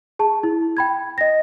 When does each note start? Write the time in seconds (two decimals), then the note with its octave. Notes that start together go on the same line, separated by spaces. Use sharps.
0.19 G#4 A5
0.43 E4
0.77 G5 B5 G#6
1.18 D#5 A#6